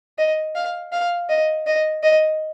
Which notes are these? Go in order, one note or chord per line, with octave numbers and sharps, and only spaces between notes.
D#5
F5
F5
D#5
D#5
D#5